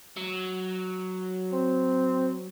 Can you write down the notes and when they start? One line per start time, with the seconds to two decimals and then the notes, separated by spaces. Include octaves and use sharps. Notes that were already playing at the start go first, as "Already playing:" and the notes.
0.17 F#3
1.53 C4